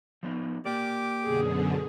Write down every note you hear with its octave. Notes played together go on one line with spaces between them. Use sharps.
F3 B3 D#4
A#3 G4 D5 D6
F#2 B2 D3 G#4